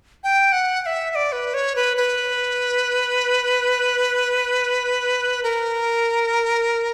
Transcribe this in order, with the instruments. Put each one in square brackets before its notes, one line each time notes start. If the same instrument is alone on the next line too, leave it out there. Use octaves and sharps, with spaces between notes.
[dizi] G5
F#5
F#5
E5
E5
D5
B4
C#5
B4
B4
A#4